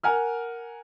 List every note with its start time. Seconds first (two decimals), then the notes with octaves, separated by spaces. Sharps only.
0.03 A#4 F#5 G#5 F6